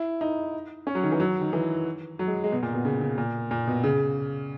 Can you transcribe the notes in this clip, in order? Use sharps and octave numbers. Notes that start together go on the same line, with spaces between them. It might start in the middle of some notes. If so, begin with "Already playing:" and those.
Already playing: E4
D#4
C#4
F#3
D#3
E3
F#3
D#3
E3
F#3
G#3
G#3
B2
A#2
B2
C#3
C#3
A#2
A#2
B2
C#3